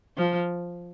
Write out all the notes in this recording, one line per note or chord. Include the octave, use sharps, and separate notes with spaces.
F3